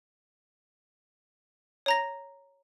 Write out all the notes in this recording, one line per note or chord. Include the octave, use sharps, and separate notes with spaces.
C#5 A#5 A#6